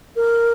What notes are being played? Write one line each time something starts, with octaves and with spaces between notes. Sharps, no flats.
A#4